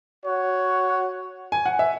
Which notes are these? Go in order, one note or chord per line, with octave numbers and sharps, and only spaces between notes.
F#4 C#5 F#5
G#5
F#5
E5